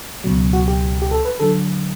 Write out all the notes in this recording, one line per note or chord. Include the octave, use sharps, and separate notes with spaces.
C#2 B2 F#3
F#4
G4
G4
A4
B4
D3 F#3 A4